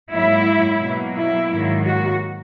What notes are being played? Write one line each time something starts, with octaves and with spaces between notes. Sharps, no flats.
G#2 F#3 A#3 E4
B2 F#3 A#3
E4
G#2 D#3 F#3 A#3
F#4